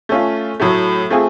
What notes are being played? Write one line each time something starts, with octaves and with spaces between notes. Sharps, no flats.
A3 C#4 F4
A2 F#3 A3
A3 C4 F4 G#4